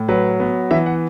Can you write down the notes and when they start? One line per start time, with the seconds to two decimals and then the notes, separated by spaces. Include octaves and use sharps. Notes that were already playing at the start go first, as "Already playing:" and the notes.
Already playing: A2
0.08 F#3 B4
0.40 B3
0.71 E3 E5
0.86 F#5